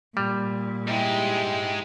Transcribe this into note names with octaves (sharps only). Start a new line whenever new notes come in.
A#2 G3
G#2 G#3 E4 G4